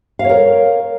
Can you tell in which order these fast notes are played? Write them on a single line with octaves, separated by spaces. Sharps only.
F5 C#5 A#4